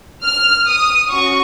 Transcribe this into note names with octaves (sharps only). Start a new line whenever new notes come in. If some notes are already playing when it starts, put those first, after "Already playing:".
F6
D#6
C#4 F#4 C#6